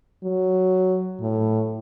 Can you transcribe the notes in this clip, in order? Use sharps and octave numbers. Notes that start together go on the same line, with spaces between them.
F#3
A2